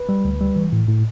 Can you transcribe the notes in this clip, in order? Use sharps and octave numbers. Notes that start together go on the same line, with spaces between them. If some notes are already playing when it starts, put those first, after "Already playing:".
Already playing: B4
G3
D2
G3
E3
A2
A2